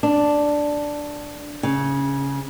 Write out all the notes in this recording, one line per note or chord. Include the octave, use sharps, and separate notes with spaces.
D4
C#3